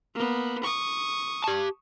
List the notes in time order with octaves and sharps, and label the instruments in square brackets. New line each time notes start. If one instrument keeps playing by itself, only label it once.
[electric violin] A#3 B3
C#6 D#6
[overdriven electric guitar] G4 A5